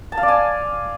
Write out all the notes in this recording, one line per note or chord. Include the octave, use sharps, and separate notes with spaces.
A5
F5
D5
G#5